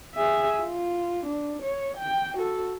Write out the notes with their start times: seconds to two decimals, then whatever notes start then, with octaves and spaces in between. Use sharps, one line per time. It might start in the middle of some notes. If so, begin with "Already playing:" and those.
0.15 G#4 E5
0.61 F4
1.26 D4
1.63 C#5
1.97 G5
2.38 F#4 A4